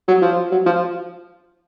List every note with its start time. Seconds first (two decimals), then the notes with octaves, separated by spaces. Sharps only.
0.08 F#3
0.22 F3
0.51 F#3
0.66 F3